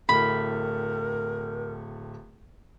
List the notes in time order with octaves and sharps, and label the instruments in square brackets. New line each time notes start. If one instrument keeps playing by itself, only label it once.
[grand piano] D1 A3 F#7 [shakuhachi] A#4 [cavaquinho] B5